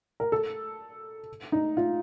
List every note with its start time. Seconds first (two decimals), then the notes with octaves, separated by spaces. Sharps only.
0.20 A#4
0.32 A4
1.52 D#4
1.77 F4